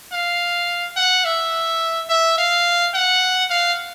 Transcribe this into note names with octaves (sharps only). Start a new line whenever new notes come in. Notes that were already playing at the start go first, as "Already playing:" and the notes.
F5
F#5
E5
E5
F5
F#5
F5